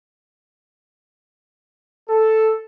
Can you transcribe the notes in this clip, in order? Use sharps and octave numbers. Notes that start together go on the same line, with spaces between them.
A4